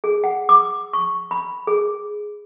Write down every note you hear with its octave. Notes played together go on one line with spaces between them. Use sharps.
G#4
F#5
D6
C#6
B5
G#4